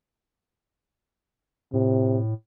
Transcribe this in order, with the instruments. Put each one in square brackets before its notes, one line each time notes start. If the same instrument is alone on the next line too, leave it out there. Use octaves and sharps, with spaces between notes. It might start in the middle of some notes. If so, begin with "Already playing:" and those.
[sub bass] A2 [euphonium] C3